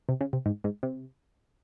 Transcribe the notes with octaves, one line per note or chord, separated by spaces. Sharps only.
C3
C#3
C3
G#2
G#2
C3